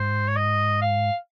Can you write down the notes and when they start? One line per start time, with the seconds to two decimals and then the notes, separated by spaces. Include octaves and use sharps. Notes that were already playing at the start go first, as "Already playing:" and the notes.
Already playing: G#2 C5
0.28 C#5
0.36 D#5
0.82 F5